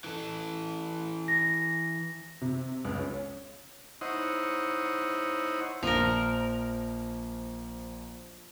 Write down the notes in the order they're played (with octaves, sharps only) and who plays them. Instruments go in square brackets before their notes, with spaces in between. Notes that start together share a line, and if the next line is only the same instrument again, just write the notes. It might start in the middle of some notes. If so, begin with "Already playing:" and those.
[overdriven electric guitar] E3 A4
[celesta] A#6
[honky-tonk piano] C3
C#2
C#4
[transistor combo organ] D#4 E4 C5 C#5 D#5 F#5
[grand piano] A#1 [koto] F3 A#4